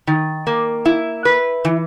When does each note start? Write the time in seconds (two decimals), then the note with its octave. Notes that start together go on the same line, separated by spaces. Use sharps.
0.07 D#3
0.47 A#3
0.86 E4
1.25 B4
1.65 E3